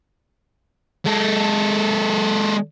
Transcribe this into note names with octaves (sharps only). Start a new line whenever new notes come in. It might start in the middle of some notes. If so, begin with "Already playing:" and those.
G#3 A4